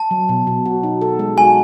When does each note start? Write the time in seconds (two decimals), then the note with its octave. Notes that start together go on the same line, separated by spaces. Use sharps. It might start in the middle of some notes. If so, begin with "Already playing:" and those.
Already playing: A5
0.11 F#3
0.29 B2
0.47 B2
0.66 F#4
0.83 D#4
1.02 A4
1.19 G#3
1.37 F#4 G#5